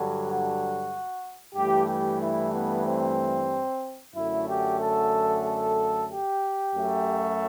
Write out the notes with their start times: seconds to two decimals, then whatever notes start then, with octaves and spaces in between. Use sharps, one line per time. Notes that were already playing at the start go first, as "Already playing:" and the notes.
Already playing: G2 D3 F#3
0.25 F#4
1.54 G2 E3 A3 G4
1.86 G4
2.19 E4
2.52 B3
2.84 C4
4.14 F#2 D3 A3 E4
4.47 G4
4.79 A4
5.45 A4
6.10 G4
6.74 F#2 F#3 A3